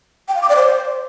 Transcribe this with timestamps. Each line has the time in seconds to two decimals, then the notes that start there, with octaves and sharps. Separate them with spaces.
0.28 G5
0.35 F5
0.42 D6
0.49 D5
0.56 C5